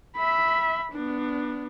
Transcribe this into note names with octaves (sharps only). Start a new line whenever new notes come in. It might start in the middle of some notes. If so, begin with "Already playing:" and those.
E5 B5
B3 D4